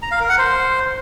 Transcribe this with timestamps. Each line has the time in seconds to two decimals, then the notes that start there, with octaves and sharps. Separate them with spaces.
0.02 A#5
0.11 F5
0.20 A#4
0.29 F#5
0.38 C5